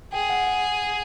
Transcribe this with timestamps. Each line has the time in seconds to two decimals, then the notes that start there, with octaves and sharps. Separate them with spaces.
0.12 G#4 G5
0.29 F#5
0.47 F#5